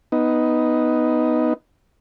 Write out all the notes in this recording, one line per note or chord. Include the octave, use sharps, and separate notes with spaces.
B3 D#4